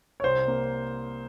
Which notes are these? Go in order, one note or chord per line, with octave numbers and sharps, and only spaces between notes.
C#5
C2 C5
A#3